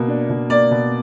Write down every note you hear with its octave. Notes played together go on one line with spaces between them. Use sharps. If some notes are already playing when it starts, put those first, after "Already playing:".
Already playing: B2 A#3
D4
B2
A#3 D5
B2